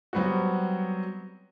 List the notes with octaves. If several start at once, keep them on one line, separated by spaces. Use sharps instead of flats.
F#3 G3 B3 C4 F#4